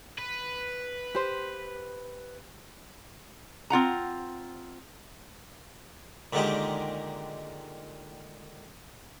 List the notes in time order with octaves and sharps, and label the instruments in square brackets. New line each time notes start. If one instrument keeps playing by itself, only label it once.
[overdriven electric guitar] B4
[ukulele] G4 C5
[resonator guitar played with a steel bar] C4 F4 F#5 A#5
[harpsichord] A#2 D3 D#3 G#3 G4 D#5